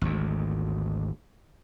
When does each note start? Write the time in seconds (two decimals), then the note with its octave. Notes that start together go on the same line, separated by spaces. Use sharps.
0.01 G#1 D2